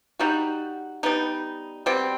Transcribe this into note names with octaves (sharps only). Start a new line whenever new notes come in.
G3 D#4 F#4
G3 B3 D#4
B2 G3 C4